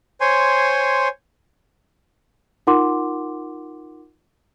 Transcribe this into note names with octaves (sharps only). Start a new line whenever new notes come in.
C5 C#5 G#5 C6
D#4 F4 A#4 F#5 C6 D6